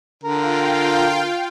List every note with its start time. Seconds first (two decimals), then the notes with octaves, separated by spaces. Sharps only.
0.24 D3 F4 A#4 F5 G5